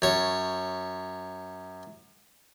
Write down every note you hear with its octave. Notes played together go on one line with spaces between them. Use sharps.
F#2 C#5